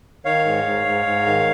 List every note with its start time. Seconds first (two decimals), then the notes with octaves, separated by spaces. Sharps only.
0.25 D#3 C#5 F5
0.45 G#2
0.65 G#2
0.86 G#2
1.06 G#2
1.26 D#3